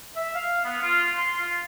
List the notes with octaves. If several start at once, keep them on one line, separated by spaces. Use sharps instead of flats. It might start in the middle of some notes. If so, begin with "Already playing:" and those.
E5
F5
B3
F4
C6
F4